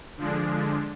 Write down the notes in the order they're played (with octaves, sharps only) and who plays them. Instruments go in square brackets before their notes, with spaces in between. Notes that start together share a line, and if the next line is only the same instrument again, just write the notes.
[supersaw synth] D3 F3 G#3 D4